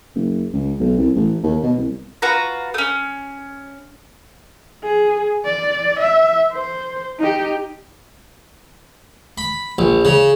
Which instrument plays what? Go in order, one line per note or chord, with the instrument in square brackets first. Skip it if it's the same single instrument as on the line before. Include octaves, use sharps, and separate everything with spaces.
[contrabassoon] F#1
C#2
B1
C2
A1
D#2
B2
C2
[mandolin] F4 F#4 B4 A#5
A3 C#4
[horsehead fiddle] G#4
D5
E5
C5
D#4 G4
[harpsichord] B5
A#1
C#3